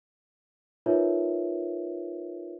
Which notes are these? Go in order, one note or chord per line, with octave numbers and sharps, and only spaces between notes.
D#4 F4 A#4 B4 C#5 E5